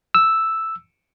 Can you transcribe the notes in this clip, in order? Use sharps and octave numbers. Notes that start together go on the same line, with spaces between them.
E6